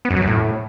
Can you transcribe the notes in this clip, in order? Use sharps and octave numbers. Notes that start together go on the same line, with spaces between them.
B3
F#2
F#3
F#2
A2